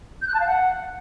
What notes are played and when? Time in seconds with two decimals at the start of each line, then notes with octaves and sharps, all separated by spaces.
0.21 G6
0.28 F#6
0.34 A5
0.40 F5
0.46 F#5